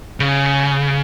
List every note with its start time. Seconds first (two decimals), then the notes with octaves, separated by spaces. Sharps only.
0.20 C#3